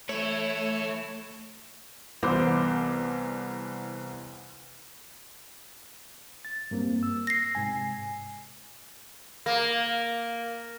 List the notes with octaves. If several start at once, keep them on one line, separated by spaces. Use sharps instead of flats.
E3 A3 E4 C#5
C2 E3 B3 C5 D6
A6
G2 A#3 C4
E6
A#6 C7
G#2 C3 G#5
A#3